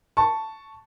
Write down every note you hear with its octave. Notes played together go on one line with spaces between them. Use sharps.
A5 C#6